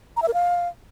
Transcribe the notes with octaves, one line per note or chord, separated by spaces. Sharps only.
A#5
E5
A#4
F5